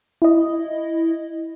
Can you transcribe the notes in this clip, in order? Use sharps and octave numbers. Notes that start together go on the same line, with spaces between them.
E4 D#5